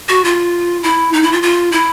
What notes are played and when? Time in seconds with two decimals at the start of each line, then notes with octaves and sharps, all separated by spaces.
0.09 F#4
0.25 F4
0.83 E4
1.13 D#4
1.23 E4
1.32 F4
1.42 F4
1.72 E4